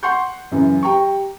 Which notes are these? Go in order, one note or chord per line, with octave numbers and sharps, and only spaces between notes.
F#5 C6 C#6 G6
F#2 C#3 E3
G4 G5 A#5 C#6